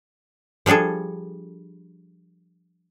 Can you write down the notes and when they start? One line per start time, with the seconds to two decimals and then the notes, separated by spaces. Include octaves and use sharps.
0.66 F3 G3 D4 G#4 A4